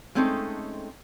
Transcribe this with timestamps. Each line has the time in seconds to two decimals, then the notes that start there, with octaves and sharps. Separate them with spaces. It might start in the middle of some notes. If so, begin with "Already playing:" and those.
0.15 G#3 A3 C4 C#4 D#4 A4